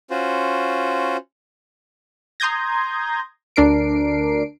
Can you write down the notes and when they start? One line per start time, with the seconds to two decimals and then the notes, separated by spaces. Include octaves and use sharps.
0.10 C#4 F4 F#4 C5
2.40 A#5 C6 D#6 G6 G#6 A#6
3.56 D2 D4 A#4 C7 D7